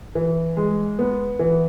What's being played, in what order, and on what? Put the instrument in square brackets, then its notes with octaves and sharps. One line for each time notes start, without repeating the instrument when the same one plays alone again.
[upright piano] E3
G#3
B3
E3